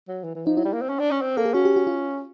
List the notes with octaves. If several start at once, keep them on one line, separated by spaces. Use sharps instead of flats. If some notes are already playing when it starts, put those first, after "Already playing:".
F#3
E3
E3
F3 D#4
F#3 E4
G3
A#3
C4
C#4
D4
C#4
C4
A#3 A4
G#4
C#4 F#4
G4
F#4
F4